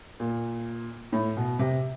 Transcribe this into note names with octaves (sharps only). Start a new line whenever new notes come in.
A#2
A2
B2
C3